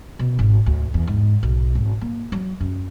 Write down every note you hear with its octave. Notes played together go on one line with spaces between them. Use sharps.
B2
G#1
D2
E2
G#2
B1
G#1
A#3
F#3
F#2